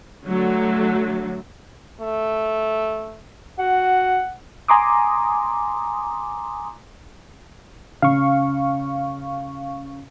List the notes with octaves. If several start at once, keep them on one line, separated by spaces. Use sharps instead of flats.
D3 F#3 A3
A3
F#4 F#5
G#5 A#5 C6 D6 D#6
C#3 F5 C#6